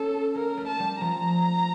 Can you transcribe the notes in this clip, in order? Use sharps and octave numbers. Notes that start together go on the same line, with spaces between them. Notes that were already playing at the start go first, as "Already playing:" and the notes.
Already playing: A#3 C#4 A4
A#3 A#4
A3
A5
G3
F3 A#5